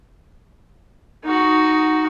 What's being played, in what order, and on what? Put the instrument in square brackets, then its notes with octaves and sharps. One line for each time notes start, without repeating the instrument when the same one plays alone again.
[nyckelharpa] D#4 F#4